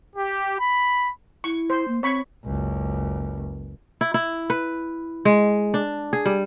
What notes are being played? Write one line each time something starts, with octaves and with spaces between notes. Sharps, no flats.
G4
B5
E4 C#6
C5
A#3
C4 C#5 B5 C#6
F#1 C#2
E4
E4
B4
G#3
D4
G#4
G3